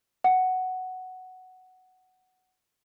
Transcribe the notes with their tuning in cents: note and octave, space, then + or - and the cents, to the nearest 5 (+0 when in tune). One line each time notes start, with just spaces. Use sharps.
F#5 +5